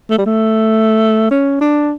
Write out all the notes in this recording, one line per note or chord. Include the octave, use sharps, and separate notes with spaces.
A3
G3
A3
C#4
D4